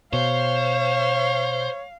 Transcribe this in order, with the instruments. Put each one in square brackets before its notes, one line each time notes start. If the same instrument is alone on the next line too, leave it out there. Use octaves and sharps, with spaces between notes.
[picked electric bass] B2 [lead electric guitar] C5 [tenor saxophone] C#5 [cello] F5